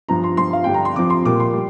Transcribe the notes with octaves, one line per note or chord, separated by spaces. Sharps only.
G2 F3 A#5
C6
G2 F3 C6
F5
G2 D3 G3 G5
A#5
C6
F2 F3 D6
C6
A#2 G3 D6
C6
G3